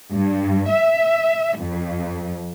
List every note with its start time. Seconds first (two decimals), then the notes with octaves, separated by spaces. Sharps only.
0.12 G2
0.70 E5
1.58 F2